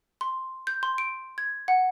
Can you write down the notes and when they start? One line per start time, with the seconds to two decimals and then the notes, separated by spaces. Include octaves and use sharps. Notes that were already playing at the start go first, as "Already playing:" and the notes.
0.21 C6
0.67 G6
0.83 C6
0.98 D7
1.38 G#6
1.68 F#5